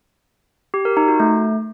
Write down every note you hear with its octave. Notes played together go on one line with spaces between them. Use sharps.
G4
A#4
D#4
F#4
A3